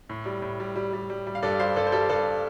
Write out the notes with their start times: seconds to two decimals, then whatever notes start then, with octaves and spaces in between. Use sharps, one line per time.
0.09 A2
0.26 G3
0.42 A2
0.60 G3
0.76 G3
0.93 G3
1.10 G3
1.27 G3
1.35 F5
1.43 G2 A4 D5
1.60 G3 C5 F5
1.76 G2 A4 D5
1.87 C5
1.92 G3 A4 D5
2.09 G2 A4 D5